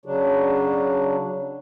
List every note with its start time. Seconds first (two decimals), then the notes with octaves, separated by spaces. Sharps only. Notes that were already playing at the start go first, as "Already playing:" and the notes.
0.06 C#3 F#3 D4